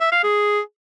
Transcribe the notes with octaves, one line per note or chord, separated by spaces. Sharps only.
E5
F5
G#4